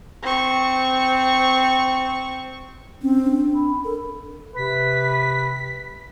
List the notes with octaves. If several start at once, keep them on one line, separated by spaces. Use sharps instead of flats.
C4 C#6
C4 C#4
D4
B5
A4 A#4
C3 B4 B6